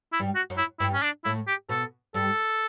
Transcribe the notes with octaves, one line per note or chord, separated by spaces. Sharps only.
E4
G2 G3
F#4
F#2 F#3
E4
G2 G3 E4
C#4
D4
A2 A3 E4
G4
B2 B3 A4
G2 G3 A4